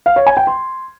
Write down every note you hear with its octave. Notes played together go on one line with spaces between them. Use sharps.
F5
C#5
G#5
G5
C6